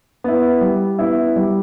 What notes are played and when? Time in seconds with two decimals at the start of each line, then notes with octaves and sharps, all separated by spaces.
0.24 B3 E4
0.61 G3
0.99 B3 E4
1.36 G3